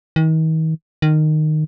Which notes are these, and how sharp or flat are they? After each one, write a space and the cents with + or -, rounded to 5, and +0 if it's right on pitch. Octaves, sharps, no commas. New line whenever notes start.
D#3 +40
D#3 -15